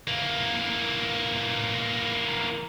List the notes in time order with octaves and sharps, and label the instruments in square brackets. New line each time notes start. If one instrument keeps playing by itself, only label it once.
[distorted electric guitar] E3 A#3